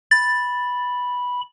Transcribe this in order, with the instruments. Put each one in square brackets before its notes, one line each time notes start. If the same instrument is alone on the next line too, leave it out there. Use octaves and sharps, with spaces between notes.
[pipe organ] B5 [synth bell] A6